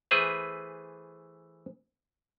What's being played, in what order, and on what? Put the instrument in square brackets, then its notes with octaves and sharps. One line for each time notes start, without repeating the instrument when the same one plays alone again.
[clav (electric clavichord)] E3 A3 G#4 B4 C5 E5